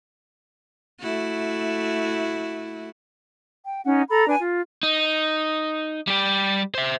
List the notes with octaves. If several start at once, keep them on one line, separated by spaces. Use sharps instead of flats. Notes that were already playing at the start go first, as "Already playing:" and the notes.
A3 E4 F#4
G5
C#4 D#4 F#5
A4 A#5 B5
D4 B4 G#5
F4
D#4
G3 G4
C5 E5